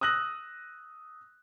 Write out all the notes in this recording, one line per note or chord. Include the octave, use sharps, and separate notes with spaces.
D#6 E6 F#6 A#6 F#7